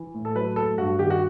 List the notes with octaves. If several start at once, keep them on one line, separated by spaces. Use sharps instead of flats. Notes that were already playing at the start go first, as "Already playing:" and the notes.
Already playing: E3
A2
A4
F#3 B4
A3 A4
G2 F#4
D#3 G4
F#4